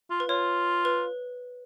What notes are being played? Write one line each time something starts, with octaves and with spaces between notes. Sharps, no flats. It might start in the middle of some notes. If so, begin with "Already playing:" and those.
F4
B4
F4 C#5
B4